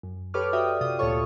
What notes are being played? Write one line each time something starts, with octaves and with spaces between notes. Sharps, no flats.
F#2
G4 A4 B4 C#5 D6 F6
F#4 D5 E5 G5 D#6
C3 F4 D#6
D2 A#2 F4 A4 C#5 C#6